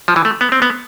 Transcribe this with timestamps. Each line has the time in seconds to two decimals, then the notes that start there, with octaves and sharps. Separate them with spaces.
0.08 F3
0.16 E3
0.25 A3
0.41 B3
0.52 C4
0.62 B3